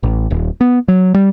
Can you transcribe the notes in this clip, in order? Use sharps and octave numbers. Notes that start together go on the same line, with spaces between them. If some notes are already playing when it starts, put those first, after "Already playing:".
A1
D#1
B3
F#3
G3